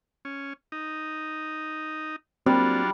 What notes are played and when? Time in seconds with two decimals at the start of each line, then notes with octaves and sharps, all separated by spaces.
0.25 C#4
0.72 D#4
2.46 F#3 G3 A#3 C4 D4 F4